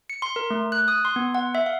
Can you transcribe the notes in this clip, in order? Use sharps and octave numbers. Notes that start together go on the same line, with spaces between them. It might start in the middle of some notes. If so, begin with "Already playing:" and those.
C#7
C6
A#4
A3
F#6
D#6
C6
B3
F#5
E5
F5